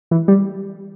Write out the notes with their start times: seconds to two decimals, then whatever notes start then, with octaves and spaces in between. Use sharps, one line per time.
0.11 E3
0.28 G3